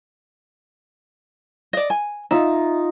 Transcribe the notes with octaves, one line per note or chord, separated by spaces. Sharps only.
D5 D#5
G#5
D#4 F4 E5